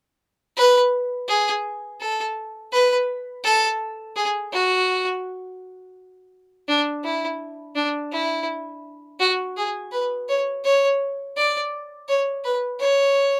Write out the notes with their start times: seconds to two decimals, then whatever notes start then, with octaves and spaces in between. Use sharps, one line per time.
0.57 B4
1.28 G#4
2.01 A4
2.72 B4
3.44 A4
4.16 G#4
4.53 F#4
6.68 D4
7.04 E4
7.75 D4
8.12 E4
9.20 F#4
9.57 G#4
9.91 B4
10.28 C#5
10.64 C#5
11.37 D5
12.08 C#5
12.44 B4
12.80 C#5